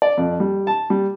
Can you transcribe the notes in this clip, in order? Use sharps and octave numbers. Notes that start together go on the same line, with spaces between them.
D5
F2
G3
A5
G3